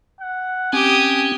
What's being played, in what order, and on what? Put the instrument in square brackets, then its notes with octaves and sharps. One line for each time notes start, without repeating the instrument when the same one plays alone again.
[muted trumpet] F#5
[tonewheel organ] C4 C#4 [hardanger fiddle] G4 D#6 [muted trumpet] G#5